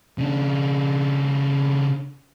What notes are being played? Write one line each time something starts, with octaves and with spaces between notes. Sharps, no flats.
C#3 D4